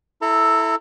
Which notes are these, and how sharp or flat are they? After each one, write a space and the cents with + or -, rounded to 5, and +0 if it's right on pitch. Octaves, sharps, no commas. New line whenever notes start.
E4 +0 A4 +0 A#5 -35